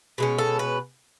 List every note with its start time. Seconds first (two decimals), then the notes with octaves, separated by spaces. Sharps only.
0.18 B2 G#3 C#4
0.38 A4
0.59 B4